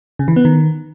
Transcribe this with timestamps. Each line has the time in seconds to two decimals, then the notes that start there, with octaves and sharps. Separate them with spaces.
0.19 C#3
0.28 E3
0.36 B3
0.45 D#3